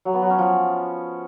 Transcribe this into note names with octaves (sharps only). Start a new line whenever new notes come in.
F#3
B3
F#3
C#4
F3